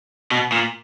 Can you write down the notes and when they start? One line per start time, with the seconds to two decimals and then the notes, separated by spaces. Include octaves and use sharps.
0.31 B2
0.52 A#2